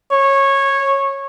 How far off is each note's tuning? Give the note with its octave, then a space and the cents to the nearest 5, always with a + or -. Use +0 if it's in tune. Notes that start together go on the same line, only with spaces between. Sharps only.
C#5 -15